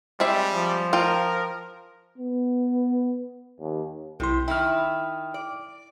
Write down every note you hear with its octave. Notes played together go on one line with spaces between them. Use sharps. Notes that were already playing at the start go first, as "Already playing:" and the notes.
G3 G#3 C4 E5
F3
F4 A#4 G5
B3
D#2
B1 C3 E4 C6
D#3 E4 G5 F6
D5